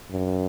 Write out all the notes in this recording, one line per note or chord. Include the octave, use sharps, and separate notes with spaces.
F#2